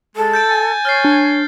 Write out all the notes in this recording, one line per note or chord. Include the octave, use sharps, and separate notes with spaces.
G#3 A4
G6 A6 D7
G#5
C#5 F6 A6 C7
D4